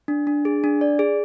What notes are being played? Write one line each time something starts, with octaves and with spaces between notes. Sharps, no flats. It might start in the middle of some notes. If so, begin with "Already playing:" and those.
D4
D4
G#4
D4
D5
G#4